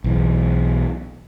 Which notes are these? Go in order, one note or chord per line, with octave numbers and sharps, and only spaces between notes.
B1 E3